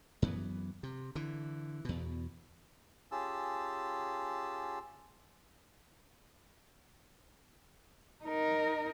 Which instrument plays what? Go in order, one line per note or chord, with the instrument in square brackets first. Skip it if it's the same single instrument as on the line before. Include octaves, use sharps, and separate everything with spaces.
[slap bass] F#2 E3 B3
C3
D3 E3
E2 B2
[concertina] C#4 F4 G4 G#4 A5 E6
[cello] D#4 A#4